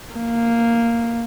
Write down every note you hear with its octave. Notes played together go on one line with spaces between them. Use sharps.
A#3